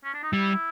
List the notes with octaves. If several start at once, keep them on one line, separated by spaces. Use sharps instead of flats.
C#4
D4
D#4
G3 E4